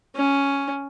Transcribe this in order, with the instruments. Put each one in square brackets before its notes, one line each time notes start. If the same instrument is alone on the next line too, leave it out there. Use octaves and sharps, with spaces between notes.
[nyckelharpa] C#4